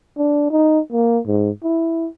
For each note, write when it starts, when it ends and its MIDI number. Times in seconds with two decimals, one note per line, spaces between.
0.18 0.46 62
0.51 0.79 63
0.93 1.19 58
1.27 1.50 44
1.63 2.08 64